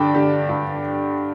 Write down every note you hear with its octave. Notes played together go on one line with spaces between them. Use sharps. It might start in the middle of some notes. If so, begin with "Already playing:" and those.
Already playing: G2 D3 D5 G5
D3 G4
G2